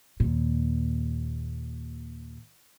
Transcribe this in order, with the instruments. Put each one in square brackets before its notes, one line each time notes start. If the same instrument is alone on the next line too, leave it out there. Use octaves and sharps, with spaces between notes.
[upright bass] D#2 A#2